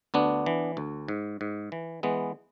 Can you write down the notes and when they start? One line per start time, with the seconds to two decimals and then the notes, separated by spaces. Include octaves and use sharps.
0.14 D2 B3 D4
0.46 E3
0.77 D2
1.08 G#2
1.41 G#2
1.72 E3
2.03 E3 G#3 B3